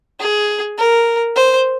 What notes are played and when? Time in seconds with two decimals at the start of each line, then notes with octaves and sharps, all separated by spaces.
0.20 G#4
0.78 A#4
1.36 C5